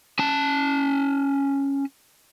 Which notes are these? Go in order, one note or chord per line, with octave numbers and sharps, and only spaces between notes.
C#4 A5